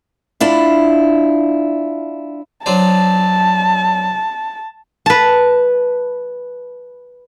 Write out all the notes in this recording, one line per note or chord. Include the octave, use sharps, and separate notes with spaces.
D4 E4 F4
F#3 D4 C5 A5
B4 A5